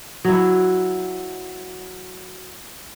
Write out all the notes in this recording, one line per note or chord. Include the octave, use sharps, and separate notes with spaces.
F#3 E4